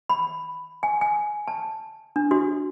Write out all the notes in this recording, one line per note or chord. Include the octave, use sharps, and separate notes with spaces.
B5
G#5
G#5
A5
D4
F#4